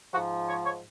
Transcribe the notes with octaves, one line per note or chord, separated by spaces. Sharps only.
G#2 F3 F#4
C#5
C#5